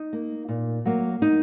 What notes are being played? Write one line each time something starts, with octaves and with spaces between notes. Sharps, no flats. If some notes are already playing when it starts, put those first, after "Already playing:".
Already playing: D#4
A#3
A#2
F#3 A#3
D#4